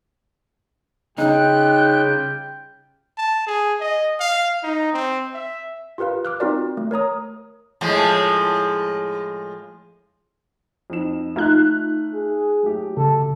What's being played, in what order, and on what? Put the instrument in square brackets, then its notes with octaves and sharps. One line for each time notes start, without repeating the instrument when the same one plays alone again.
[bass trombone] C#3 [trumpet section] G3 F4 G5 [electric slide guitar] D#4 [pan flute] F#6
[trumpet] A5
G#4
D#5
F5
D#4
C4
E5
[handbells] F4 G4 A#4 B4 F5
D6 F6 F#6
C4 D#4 F4 F#4 A#4 D5
A3
A#4 C#5 A#5 D#6
[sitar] A2 F3 G#3
[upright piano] F2 D#4 E7
[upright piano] A3 F6 [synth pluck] D#4 F4 F#6
[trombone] G#4
[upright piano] F#3 A3 G4
[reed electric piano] C#3 [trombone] A4